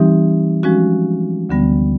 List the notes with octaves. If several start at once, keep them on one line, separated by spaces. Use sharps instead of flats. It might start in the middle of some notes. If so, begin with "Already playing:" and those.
Already playing: E3 G3 C4 D#4 G4
F3 G#3 C#4 F#4
D2 D3 G3 B3